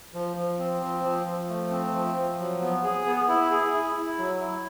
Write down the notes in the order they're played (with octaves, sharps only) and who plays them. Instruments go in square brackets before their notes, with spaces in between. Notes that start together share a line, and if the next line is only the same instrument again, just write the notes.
[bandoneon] F3
F3
C4
F3
F3
F3
A3
C4
F3
F3
F#3
B3
G#4
B3
E4
G#4
E4
E4
F#3
E4